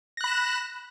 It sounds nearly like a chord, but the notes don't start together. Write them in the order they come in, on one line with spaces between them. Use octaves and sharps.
A#6 F#6 B5 E7